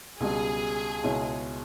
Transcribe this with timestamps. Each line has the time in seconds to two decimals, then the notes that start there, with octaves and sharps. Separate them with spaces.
0.20 C#2 B2 G3 G#4
1.04 C#2 B2 G#3 C#4 E4